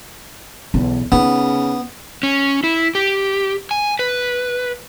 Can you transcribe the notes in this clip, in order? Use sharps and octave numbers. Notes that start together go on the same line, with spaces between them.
B1 E2
C#3 B3 D#4
C#4
E4
G4
G#5
B4